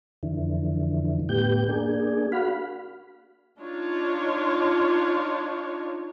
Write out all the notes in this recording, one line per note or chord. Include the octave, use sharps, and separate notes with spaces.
F2 D3 E3
A2 B3 G4 G6
A#3 D4 G#4
F#4 F5 B5
D4 D#4 F4 C#5